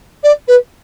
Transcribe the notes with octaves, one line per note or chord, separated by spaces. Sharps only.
D5
B4